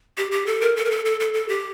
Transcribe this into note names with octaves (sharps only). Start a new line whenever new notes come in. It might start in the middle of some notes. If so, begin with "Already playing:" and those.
G4
G4
A4
A#4
A4
A#4
A4
A4
A4
A4
G4